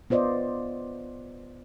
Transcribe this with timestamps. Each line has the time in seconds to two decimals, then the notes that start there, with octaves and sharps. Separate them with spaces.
0.10 B3 F4 C5 D5 D#5